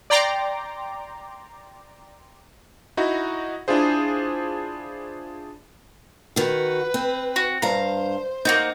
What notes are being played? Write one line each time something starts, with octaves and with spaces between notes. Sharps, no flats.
D5 G5 A#5 C6 D6
D#4 E4 F#4
D4 E4 F4 G#4 C5
D#3 F#4 B4
C4
F#4
G2 C5 F5 A#5
A#3 D#4 F#4 G6